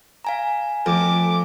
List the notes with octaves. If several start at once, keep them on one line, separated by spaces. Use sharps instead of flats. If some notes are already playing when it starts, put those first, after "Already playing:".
F5 G#5 A#5
F2 A3 D6